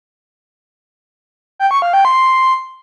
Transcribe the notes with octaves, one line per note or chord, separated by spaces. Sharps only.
G5
C#6
F5
G5
C6